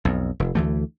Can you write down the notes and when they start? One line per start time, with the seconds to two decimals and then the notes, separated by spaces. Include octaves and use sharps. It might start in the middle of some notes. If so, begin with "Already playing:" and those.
0.05 B1 F2
0.40 F1
0.55 D2 E3 A3